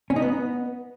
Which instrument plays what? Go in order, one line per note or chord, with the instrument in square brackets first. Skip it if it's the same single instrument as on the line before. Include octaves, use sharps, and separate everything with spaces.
[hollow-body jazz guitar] C#4
D#4
B3